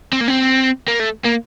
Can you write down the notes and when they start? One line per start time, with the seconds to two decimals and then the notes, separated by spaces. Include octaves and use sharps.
0.13 C4
0.21 A#3
0.28 C4
0.88 A#3
1.00 A3
1.24 A#3